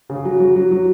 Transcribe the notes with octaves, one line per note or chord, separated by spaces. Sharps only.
C#3
F#3
F#3
F#3
F#3